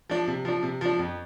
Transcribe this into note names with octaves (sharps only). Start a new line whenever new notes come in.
F3 D4
C3
F3 D4
C3
F3 D4
F2